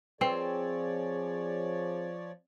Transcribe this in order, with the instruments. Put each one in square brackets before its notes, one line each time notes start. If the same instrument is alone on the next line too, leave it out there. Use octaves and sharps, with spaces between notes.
[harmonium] F3 C#5 D5 [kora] C4 [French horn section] G#4 [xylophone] B4 G5